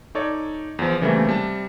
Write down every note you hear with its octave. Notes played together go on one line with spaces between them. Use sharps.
D#4 A4 C#5 D5
E2 F3
C#3 E3 G3 A3 A#3 C4
C3 G3 A5